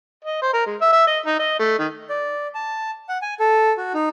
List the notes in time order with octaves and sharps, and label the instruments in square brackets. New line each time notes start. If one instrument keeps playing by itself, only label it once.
[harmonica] D#5
C5
A#4
G#3
E5
E5
D#5
D#4
D#5
A3
D#3
[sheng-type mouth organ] D5
A5
F#5
G#5
A4
F#4
D#4